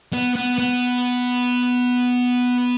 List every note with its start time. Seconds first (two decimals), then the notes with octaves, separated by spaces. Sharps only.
0.13 B3
0.36 B3
0.59 B3